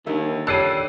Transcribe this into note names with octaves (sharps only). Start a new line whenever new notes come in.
D#2 D3 D#3 E5
G3 A4 C#5 E6 F#6 C7 D#7